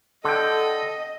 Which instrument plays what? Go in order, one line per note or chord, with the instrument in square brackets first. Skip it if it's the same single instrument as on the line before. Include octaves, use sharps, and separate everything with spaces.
[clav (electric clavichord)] D3 G5 [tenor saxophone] A4 [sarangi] D#5